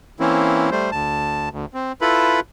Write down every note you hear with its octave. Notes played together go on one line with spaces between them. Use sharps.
E3 A#3 C4 C#4 E4
G3 A3 C5
D2 A5
D2
C4
E4 F4 A4 B4 B5